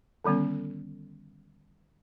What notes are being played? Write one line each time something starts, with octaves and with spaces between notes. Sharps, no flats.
D3 D#3 G3 B3 C#4